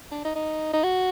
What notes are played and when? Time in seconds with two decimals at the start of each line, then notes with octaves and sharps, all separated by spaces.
0.12 D4
0.24 D#4
0.35 D#4
0.73 D#4
0.84 F#4